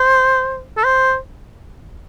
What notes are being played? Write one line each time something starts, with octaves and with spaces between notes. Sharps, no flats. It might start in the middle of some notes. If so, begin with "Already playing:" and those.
Already playing: C5
A4
C5